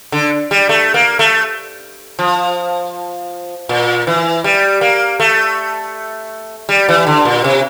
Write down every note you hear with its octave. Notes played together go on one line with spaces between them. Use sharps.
D3
G3
A3
A#3
A3
F3
A#2
E3
G3
A#3
A3
G3
E3
D3
A#2
C3